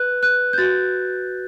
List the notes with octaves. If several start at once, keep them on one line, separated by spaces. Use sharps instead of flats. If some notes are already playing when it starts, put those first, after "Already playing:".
Already playing: B4 F#6
B4 F#6
G6
F#4 A6